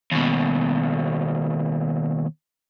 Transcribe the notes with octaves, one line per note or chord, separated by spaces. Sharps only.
D#2 B2